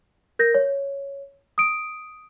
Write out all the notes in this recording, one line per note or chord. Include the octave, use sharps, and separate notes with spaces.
A#4 G6 A#6
C#5
D#6 D7